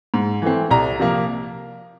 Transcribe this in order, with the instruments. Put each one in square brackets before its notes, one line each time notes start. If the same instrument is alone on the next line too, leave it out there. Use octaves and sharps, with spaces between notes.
[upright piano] G#2
E3 A3 C4
C2 A#5
C3 F3 A#3